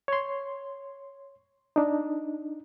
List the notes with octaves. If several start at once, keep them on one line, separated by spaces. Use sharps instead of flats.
C#5 C6
D4 D#4